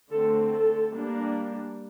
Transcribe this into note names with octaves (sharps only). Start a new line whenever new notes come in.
D3 A3 C4 A4
A4
G3 A#3 D4